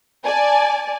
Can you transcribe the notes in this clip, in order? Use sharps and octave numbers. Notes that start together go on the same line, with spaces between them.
D5 G#5 A5